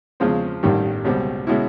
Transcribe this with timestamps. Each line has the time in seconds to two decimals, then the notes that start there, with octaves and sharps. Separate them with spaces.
0.20 E2 C#3 F3 G#3 C4
0.63 A1 G2 D#3 G3
1.04 C#2 B2 G3 C4
1.47 B2 G#3 C#4 E4